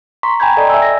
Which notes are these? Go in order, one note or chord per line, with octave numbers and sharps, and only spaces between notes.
A#5 C6 C#6 B6
G5 G#5 A#5 B5 G6 G#6
A4 D5 D#5 A5
E5 G#5 E6
A#6